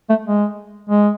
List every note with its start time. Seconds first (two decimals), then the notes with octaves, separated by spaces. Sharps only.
0.09 A3
0.26 G#3
0.89 G#3